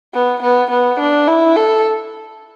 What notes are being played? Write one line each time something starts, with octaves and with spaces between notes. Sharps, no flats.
B3
B3
B3
D4
E4
A4